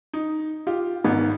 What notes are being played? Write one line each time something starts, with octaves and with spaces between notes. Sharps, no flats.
D#4
F4 G4
G#1 G#2 B3